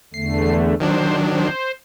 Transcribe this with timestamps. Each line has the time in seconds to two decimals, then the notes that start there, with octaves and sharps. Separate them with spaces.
0.14 E2 D3 A3 C7
0.80 D#3 F#3 D4 C5
1.31 C5